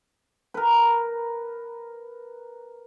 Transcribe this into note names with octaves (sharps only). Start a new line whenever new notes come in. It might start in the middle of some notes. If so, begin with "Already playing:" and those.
A#4 B4